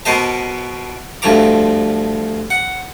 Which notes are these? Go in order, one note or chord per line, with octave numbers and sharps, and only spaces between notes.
B2 B3 A#4 C5 D#5 A5
D2 G2 F3 A5 A#5 D6
F#5